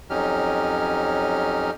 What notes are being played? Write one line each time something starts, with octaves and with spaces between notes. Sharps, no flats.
F2 F#3 C#4 D#4 G4 F6